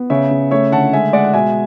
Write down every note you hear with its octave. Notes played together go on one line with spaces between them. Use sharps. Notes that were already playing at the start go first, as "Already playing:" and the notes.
Already playing: B3
C#3 C#5 E5
C#3
A3 C#5 E5
D3 F#5 A5
G#3 E5 G#5
G#3 D5 F#5
F#5
B2 E5 G#5